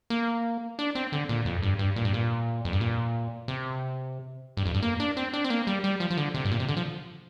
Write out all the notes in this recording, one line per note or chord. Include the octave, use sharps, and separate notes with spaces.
A#3
D4
C4
D3
A#2
F2
G2
G2
A#2
G2
A#2
F2
G2
A#2
C3
G2
F2
G2
A#3
D4
C4
D4
C4
A#3
G3
G3
F3
F3
D3
C3
G2
A#2
C3
D3
F3